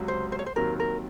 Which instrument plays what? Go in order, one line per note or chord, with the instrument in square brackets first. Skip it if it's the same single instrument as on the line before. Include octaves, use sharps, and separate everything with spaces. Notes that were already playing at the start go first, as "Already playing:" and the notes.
Already playing: [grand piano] C#2 C3 F#3
[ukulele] C5
C5
C#5
C5
[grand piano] D#2 D#3 F#3 C4 [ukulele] A#4
[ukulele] A#4